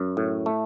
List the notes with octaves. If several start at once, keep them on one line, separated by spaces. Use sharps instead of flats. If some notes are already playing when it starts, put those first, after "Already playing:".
Already playing: F#2
A2
A3